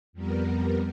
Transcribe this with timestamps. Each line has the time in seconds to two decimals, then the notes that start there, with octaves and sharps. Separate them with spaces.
0.13 F2 G3 B3 A#4